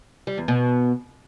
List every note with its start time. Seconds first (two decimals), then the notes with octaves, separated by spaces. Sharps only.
0.27 G3
0.38 E2
0.48 B2